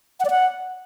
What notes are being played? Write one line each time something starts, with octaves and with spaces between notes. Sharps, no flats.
F#5
D5
F#5